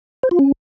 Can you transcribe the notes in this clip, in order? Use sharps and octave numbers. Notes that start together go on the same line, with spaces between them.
C5
F4
C#4